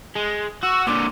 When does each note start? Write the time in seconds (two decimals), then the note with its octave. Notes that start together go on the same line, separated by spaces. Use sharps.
0.15 G#3
0.63 F#4 E6
0.87 A#2 D3 D6